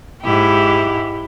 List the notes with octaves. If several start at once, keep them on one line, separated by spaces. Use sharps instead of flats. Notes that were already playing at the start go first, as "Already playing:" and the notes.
G#2 E4 G4